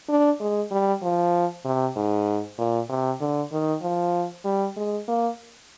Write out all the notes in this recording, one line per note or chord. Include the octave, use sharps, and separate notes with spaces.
D4
G#3
G3
F3
C3
G#2
A#2
C3
D3
D#3
F3
G3
G#3
A#3